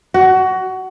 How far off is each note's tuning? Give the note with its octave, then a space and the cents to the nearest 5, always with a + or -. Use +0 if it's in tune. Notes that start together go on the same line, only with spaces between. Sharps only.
F#4 +20